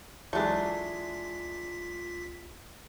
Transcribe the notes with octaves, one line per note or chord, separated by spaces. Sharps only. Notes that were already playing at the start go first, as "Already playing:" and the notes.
C#2 E3 F#3 G#3 A3 D4 F4 B6